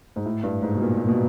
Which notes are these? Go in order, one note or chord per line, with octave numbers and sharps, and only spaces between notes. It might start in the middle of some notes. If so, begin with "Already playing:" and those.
G#2
A2
G2
G#2
B2
A#2
A#2
B2